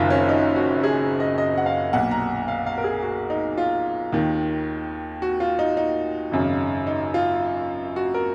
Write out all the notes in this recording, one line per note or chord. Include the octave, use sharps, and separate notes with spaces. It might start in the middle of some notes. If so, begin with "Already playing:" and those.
Already playing: F#1 F#2 D#3 F4
C#4
D#4
F#4
G#4
D#5
D#5
F#5
F5
B1 A#2 F#5
A#5
F5
F5
A#4
G#4
F#4
D#4
F4
D#2 D#3
F#4
F4
D#4
D#4
G#1 F#2 C#3
D#4
F4
F#4
A#4